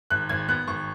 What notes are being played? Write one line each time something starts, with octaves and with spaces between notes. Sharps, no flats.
G#1 F#6
G#1 G#6
B3 F#6
G#1 C#6